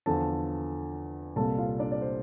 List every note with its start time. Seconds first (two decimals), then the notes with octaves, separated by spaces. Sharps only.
0.06 E2 D3 F3 A4 A5
1.36 C2 A#2 G3 A4 A5
1.58 F4 F5
1.79 D4 D5
1.92 D5
2.02 C5